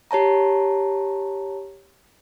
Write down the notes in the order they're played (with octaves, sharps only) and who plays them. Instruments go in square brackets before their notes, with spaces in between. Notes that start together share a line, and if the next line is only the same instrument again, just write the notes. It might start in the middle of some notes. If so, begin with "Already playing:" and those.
[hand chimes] G4 C#5 A5 A#5